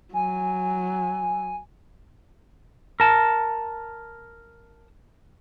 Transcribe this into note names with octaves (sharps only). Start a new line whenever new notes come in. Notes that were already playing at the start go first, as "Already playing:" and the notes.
F#3 G#5
A#4 A5